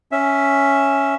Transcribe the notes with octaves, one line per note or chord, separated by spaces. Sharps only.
C#4 E5